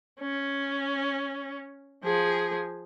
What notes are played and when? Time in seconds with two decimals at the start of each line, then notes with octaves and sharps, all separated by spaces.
0.21 C#4
2.04 F3 G#4